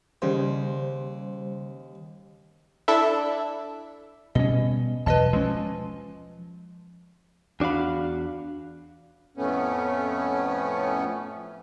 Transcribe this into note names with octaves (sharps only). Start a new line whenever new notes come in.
D#2 C#3 G3 C5
D4 E4 A4 E5
B2 G3 C#4 D#5
B1 E2 B4 D#5 A5
F3 G#3 C#4
E2 D4 F#4 F5 B5
F2 A2 A3 B3 C#4